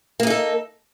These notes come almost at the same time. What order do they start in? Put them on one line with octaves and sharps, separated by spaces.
A#3 G#4 D#4 A4